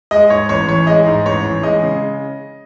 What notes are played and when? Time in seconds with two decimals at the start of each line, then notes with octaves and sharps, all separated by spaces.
0.11 G#3 D#5
0.30 G#2 C#5
0.49 A1 C#5
0.68 E3 C#5
0.87 G#3 D#5
1.06 G#2
1.25 A1 C#5
1.45 E3
1.63 G#3 D#5
1.83 C#3